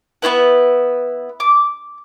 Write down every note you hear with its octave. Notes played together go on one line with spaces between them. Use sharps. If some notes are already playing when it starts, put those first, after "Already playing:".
B3 C#4 E4 B4
D6